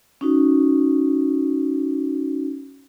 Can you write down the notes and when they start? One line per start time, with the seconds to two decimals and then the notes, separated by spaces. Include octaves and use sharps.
0.21 C#4 D#4 F#4